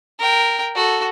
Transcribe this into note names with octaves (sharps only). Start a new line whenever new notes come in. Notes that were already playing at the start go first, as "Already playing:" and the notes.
A#4 G5
F#4 A4